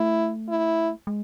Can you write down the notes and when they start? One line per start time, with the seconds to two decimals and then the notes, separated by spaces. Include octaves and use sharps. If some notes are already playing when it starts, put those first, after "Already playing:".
Already playing: A3 E4
0.49 E4
1.07 G#3